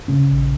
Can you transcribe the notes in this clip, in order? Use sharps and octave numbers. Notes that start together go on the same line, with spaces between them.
C#3 C#4
A#1